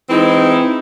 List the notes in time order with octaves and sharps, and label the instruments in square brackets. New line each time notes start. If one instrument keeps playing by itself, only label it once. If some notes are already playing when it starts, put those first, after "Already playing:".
[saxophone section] E3 G#3 C4 D#4 E4